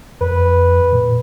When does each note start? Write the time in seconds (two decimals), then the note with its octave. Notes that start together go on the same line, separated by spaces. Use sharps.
0.21 F2 B4
0.92 A#2